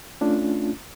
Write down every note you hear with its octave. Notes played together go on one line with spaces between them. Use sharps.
A3 C#4 D4 F4